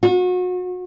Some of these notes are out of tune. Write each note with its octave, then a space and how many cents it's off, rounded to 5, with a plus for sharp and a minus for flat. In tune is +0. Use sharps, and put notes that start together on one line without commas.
F#4 -35